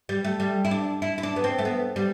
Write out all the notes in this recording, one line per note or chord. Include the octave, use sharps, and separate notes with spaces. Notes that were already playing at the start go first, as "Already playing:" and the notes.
G3
A3
G3
E4
D4
E4
E4
D4
B3
C4
A3
B3
G3